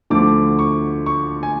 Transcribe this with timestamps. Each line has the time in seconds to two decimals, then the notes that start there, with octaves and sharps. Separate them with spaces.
0.10 D2 D3 F3 A3 D6
0.59 C#6
1.06 C#6
1.43 G#5